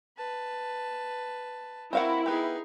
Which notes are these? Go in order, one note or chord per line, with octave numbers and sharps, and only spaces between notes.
B4 A5
C4 E4 F#4 A#4 F5 F#5
B3 D#4 G4 G#4